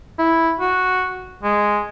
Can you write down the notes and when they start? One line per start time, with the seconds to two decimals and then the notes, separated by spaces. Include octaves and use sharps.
0.19 E4
0.60 F#4
1.43 G#3